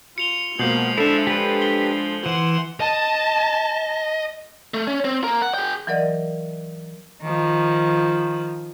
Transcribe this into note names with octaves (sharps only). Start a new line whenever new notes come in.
F4 C#7 F7 G7
B2 F3 G#3 A#3 G6 C7 F#7
D4 E4 A4 E5
G4 B4
G7
E3 F#5 C6
D#5 A5
A3
C#4
C4
A#3 A#4
F#5
G#4 G5
E3 F#3 A#4 D5 D#5
D#3 F3